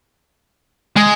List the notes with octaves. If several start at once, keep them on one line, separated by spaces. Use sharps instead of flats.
G#3